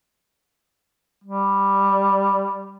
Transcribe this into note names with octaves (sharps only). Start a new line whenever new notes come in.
G3